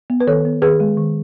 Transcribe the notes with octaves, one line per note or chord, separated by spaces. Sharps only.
B3
B4
D#3 A4 C#5
B3
D#3 G#4 B4
G#3
D#3